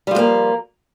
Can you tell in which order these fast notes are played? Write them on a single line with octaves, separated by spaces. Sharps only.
G3 F3 G#3 A#3